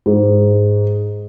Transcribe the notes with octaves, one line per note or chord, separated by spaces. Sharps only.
G#2